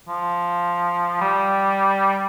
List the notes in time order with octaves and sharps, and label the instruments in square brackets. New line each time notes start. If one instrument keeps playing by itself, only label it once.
[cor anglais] F3
G3